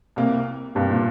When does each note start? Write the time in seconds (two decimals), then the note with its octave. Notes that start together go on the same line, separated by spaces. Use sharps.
0.16 C2 C3 A#3
0.75 C2 G2 C3 A#3
0.90 A#2